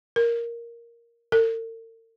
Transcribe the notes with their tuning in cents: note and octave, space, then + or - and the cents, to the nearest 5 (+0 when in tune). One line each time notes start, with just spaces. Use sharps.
A#4 +5
A#4 -45